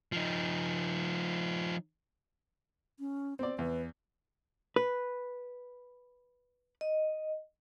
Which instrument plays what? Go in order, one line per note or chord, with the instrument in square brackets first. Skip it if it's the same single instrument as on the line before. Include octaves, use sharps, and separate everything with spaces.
[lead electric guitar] F3 D#4
[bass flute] C#4
[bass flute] B3 [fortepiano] C4 D5
[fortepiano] E2 [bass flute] B4
[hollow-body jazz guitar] B4
[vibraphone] D#5